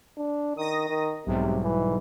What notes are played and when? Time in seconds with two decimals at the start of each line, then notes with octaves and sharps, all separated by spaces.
0.17 D4
0.57 D#3 D#6 A#6
0.89 D#3
1.27 B1 G#2 C3 G3
1.63 E3